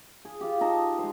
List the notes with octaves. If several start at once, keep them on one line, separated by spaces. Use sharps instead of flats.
G#4
F4 G4
D#4 D#5 A5
G#3 C5